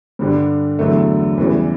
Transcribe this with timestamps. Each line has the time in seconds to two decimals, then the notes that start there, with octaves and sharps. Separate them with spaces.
0.19 G2 D3 G3
0.79 E2 D3 F#3 A3
1.38 E2 C#3 E3 G3